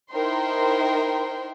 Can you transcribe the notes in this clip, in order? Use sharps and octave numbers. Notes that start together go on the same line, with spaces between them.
D#4 E4 A#4 C5 G5 C6